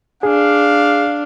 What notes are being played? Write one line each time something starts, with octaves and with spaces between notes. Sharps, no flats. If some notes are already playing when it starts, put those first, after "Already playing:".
D4 G#4 F5